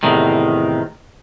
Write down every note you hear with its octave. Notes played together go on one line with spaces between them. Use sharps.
E2 A2 C3 D#3